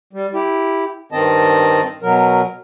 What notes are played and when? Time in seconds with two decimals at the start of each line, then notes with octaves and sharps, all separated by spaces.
0.13 G3
0.34 E4 G4
1.12 G2 D#3 C4 D#5 A5
2.02 B2 F#3 A#4